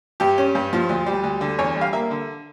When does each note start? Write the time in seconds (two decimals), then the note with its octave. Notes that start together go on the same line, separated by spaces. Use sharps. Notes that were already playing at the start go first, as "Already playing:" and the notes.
0.20 G2 G4
0.38 C#4
0.55 G2
0.73 F3
0.89 D2
1.06 G3
1.23 D2
1.41 D3
1.59 E2 C#5
1.76 G3
1.81 F5
1.93 A#3 E5
2.11 D3